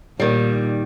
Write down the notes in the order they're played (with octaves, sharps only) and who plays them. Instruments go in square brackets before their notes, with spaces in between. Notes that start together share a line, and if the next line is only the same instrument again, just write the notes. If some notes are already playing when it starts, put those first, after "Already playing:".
[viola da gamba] A#2 [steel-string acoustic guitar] D#3 G3